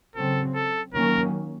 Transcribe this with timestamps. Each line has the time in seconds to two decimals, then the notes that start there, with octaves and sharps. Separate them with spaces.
0.15 C#3 F#3 C4 A4
0.55 A4
0.94 D#3 F#3 A#3 C#4 A#4